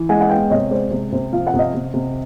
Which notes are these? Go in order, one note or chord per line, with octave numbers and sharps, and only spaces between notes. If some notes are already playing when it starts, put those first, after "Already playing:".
Already playing: E3
G#3 F#5 G#5
F#5
B3 F5 G5
C3 C#5 D#5
G#3 C5 D5
C3
C3 C5
F3 F5
F#5
C3
D#5 F5
C3
C3